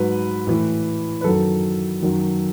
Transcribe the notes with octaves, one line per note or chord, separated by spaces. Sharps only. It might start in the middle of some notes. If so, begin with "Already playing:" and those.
Already playing: G#2 F#3 B4
A2 E3
B4
F#2 D#3 F#3 A4
F#2 D#3 F#3